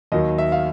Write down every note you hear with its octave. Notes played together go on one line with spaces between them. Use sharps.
D#2 D#3 F#3 D#5
E5
F5